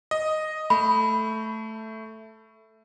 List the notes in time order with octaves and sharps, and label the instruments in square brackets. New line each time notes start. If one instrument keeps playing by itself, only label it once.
[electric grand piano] D#5
[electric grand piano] A3 [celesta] B5